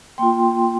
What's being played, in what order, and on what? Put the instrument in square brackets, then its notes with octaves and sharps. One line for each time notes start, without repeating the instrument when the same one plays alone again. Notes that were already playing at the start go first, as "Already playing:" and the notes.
[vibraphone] A#3 F4 G5 C6